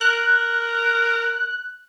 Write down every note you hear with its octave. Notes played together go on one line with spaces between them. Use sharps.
A#4 F#6